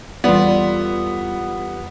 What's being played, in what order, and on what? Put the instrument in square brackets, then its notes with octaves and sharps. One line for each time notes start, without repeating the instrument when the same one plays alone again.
[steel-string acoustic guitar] E2 G3 A4 [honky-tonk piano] B3 [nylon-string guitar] F4 D5